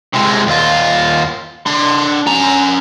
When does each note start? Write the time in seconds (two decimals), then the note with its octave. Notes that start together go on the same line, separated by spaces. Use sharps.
0.13 C3 G#3
0.47 D#2 F4
1.66 D4 C6
2.26 C#4 A#5